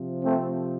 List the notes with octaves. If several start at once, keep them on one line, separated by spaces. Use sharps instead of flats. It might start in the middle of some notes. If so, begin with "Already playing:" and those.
Already playing: C3 F3
A3 C4